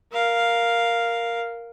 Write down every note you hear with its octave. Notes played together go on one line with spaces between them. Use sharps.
A#4 F5